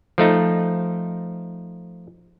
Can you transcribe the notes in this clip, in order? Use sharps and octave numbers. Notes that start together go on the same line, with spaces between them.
F3 A3 D#4